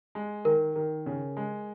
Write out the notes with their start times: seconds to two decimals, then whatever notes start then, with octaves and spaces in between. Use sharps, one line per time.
0.15 G#3
0.45 D#3 A#4
0.76 D#3
1.06 C#3
1.37 G#3